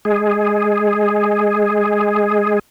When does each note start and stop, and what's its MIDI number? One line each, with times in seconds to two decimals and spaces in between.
0.05 2.59 56
0.05 2.59 68